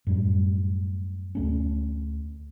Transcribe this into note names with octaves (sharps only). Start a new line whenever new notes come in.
F#2 A2 G3
D2 A3 C#4